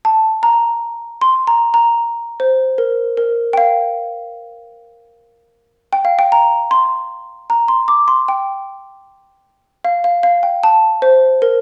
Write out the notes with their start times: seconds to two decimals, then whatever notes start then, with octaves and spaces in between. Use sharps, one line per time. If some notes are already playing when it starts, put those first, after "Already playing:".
0.05 A5
0.43 A#5
1.21 C6
1.47 A#5
1.74 A#5
2.40 C5
2.78 A#4
3.17 A#4
3.53 G5
3.57 F5
5.93 G5
6.05 F5
6.19 G5
6.32 A#5
6.71 C6
7.50 A#5
7.68 C6
7.88 D6
8.08 C6
8.28 G5
9.84 F5
10.04 F5
10.23 F5
10.43 G5
10.63 A5
11.02 C5
11.42 A#4